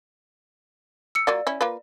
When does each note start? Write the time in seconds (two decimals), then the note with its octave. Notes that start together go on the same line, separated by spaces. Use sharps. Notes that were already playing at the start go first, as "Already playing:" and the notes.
1.15 E6 C#7
1.27 F#3 A#3 F4 D5
1.47 C#4 E4
1.61 A#3 F4 B4